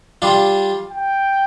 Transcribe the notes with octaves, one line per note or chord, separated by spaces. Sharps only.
G3 D4 F4
G5